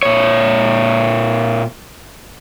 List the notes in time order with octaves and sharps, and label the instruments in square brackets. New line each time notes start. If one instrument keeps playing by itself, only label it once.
[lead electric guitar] A#2 C#5